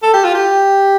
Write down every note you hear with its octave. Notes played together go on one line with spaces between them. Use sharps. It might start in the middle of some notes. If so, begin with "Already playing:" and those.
A4
G4
F4
G4